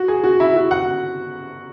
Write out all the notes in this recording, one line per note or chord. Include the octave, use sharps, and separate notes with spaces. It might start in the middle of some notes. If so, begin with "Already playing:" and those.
Already playing: F#4
G#4
F#4
E4
F#4
F#5